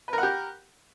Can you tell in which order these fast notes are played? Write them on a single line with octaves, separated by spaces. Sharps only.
B4 A#4 F#5 G4